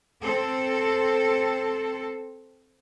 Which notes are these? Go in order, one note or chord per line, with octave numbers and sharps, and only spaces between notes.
C4 A4